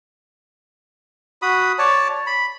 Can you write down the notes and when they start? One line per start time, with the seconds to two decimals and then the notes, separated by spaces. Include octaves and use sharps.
1.42 F#4 B5 D#6
1.79 C#5 D5 A5
2.27 B5